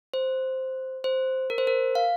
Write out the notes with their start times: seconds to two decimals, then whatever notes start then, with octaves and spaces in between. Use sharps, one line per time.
0.14 C5
1.04 C5
1.50 A#4
1.58 C5
1.67 A#4
1.95 F5